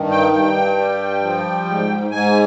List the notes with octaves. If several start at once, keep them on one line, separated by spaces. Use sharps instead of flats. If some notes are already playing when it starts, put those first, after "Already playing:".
Already playing: G2 D#3
G5
G2 G5
G3
F3
G#2
G#2 G#5